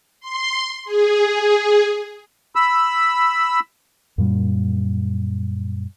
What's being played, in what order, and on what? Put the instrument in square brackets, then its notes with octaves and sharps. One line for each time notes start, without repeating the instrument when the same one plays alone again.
[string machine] C6
G#4
[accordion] B5 E6
[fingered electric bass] F#2 A#2 G3